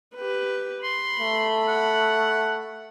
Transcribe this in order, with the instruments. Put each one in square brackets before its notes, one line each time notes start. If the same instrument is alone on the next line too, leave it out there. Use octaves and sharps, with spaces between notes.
[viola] G4 B4
[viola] B5 [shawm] C6
[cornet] A3
[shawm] F#5